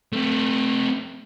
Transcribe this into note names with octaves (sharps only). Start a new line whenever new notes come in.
A3 C4